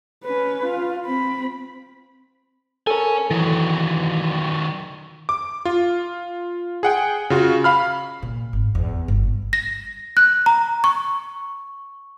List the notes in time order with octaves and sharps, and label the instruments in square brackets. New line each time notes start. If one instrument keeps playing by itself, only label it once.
[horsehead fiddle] C#4 B4
F4
C4 B5
[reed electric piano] A4 A#4 [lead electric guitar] C#5 G#5
[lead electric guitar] D#3 F#3 [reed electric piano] E3
[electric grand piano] D6
F4
G#4 F#5 G5
C#3 F4 F#4
F5 B5 F6
[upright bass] A#2
G#1
E2
G1
[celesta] A#6
F#6
A#5
C#6